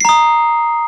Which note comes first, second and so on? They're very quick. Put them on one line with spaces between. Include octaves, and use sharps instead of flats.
C7 A#5 D#6